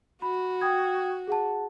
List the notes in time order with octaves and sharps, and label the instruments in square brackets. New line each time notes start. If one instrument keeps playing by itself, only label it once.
[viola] F#4 [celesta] B5
[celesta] G5 D#6 G#6
G#4 F#5 A5